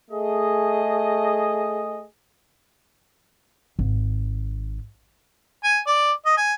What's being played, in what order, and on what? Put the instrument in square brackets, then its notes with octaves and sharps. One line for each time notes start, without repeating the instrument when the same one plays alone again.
[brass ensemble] A3 G#4 D#5
[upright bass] G#1
[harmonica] G#5
D5
D#5
G#5